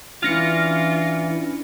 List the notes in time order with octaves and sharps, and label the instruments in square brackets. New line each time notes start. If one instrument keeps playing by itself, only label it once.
[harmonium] E3 [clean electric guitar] C#4 D4 F5 [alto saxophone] F4 [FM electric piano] F6 A#6 C#7